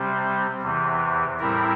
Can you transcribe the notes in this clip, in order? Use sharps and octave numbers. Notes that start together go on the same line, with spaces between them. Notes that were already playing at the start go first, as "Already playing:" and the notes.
Already playing: C3 G3 C4
E2 C3 E3
A2 G3 C4 E4 A#4